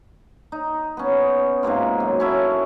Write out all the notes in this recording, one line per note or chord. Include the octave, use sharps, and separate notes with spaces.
D#4
B3 C#4
G#2 C3 A#3 F4
F#2
C#4 E4 A4